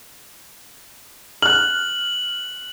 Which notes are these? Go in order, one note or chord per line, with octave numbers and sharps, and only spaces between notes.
F6 F#6 F#7